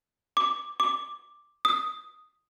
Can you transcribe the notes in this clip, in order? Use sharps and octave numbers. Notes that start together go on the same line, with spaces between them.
D6
D6
D#6